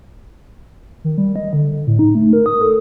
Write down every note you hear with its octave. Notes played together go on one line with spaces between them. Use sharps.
D#3
G3
D#5
D3
D3
A2
D#4
A3
A#4
D#6
A4